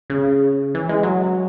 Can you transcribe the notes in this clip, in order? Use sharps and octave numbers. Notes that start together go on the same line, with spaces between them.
C#3
E3
G#3
F#3